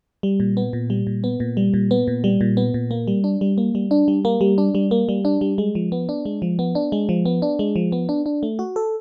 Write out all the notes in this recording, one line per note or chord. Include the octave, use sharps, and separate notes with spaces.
G3
A#2
B3
A#2
G3
A#2
B3
A#2
G3
A#2
B3
A#2
G3
A#2
B3
A#2
A#3
G3
D4
G3
A#3
G3
D4
G3
A#3
G3
D4
G3
A#3
G3
D4
G3
G#3
F3
B3
D4
G#3
F3
B3
D4
G#3
F3
B3
D4
G#3
F3
B3
D4
D4
A3
F#4
A4